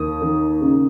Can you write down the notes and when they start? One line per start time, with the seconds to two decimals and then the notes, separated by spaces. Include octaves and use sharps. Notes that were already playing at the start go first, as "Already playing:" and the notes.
Already playing: D#2 D#6
0.22 D#3
0.61 C#3